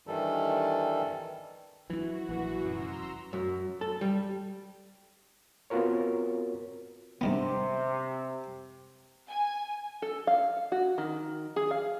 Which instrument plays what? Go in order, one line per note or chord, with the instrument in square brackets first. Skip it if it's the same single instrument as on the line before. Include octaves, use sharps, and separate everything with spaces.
[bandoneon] G2 D#3 E3 G3 A4
[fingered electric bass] E3 [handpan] F#3 E4 [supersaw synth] F#4
[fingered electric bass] A#1 [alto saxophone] E3
[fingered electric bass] F1 F#2 [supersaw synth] A#5 C6 E6
[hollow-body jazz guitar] F#2
A4
G3
[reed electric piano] B3 C4 F4 F#4 A#4 C#5
[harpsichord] G2 D#3 B3 [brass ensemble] C3
[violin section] G#5
[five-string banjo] A4
F5
F#4
D#3
G#4
F5